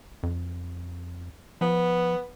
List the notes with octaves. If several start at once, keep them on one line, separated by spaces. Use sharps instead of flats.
F2
F3 B3